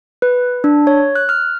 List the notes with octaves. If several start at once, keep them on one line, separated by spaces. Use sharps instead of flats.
B4
D4
C#5
F#6
F6